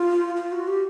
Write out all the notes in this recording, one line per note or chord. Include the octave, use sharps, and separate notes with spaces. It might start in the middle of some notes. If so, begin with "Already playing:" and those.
Already playing: F4
F4
F#4
G4